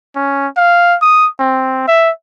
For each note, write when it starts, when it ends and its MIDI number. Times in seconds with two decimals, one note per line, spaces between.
0.16 0.47 61
0.57 0.97 77
1.02 1.28 87
1.39 1.83 60
1.88 2.11 76